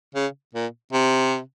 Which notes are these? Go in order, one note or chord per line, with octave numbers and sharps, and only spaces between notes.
C#3
A#2
C3